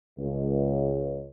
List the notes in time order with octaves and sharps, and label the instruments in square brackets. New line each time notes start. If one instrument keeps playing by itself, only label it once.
[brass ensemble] C#2